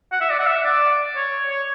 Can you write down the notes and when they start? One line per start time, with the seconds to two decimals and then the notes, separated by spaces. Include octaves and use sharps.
0.12 F#5
0.21 E5
0.30 D5
0.39 F#5
0.47 E5
0.64 D5
1.16 C#5
1.50 C#5